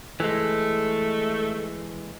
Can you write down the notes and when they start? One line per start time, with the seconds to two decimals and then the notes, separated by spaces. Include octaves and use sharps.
0.20 E3 G#3 A3